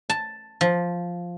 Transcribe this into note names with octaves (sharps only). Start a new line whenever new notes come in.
A5
F3